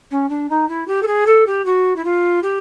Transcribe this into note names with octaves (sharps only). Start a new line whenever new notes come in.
C#4
D4
D#4
E4
G4
A4
G#4
A4
G4
F#4
E4
F4
G4